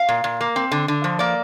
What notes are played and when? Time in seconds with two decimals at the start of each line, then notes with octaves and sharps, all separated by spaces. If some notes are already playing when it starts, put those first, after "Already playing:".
Already playing: F5
0.09 A#2
0.24 A#2
0.41 A#3
0.56 C4
0.71 D3
0.88 D3
1.04 F3
1.19 A#3 D5